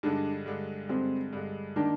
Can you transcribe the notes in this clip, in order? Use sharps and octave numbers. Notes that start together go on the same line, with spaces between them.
G2 D3 G#3 D4
G2 D3 G#3
G2 D3 G#3 C4
G2 D3 G#3
D#3 A#3 D4